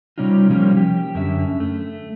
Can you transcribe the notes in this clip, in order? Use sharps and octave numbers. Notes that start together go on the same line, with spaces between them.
C3 G3 C#4 D#4 F4
F3 G3 A#3 C#4
G4
F#2 D3 C#4 E5
A3